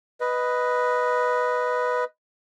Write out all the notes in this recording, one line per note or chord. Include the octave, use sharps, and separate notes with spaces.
B4 D#5